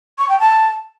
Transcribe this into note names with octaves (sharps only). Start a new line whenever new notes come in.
C#6
G5
A5